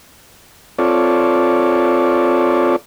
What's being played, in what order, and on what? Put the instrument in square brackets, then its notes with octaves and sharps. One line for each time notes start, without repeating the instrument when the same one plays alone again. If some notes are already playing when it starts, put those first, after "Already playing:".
[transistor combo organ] C4 F4 A4 C#5 D5